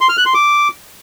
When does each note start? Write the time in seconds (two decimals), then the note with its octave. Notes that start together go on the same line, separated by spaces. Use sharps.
0.01 C6
0.09 F6
0.17 F#6
0.26 C6
0.34 D6